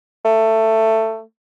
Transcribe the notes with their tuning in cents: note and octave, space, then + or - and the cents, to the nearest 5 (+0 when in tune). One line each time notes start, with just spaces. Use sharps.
A3 +15